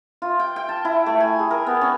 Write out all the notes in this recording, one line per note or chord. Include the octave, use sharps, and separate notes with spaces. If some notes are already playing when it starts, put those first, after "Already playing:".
F4
G5
G5
A5
E4
A3
G#5
G#4
A#4
B3
C#4